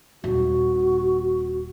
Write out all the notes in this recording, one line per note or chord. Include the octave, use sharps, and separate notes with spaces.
D#1 C4 F#4